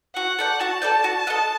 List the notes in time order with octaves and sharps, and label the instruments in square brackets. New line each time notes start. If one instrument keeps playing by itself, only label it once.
[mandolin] F#4 [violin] F#5
[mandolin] A4 D5 G5
[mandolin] F#4 [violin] A5
[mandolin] A4 D5 G5
F#4
A4 D#5 F#5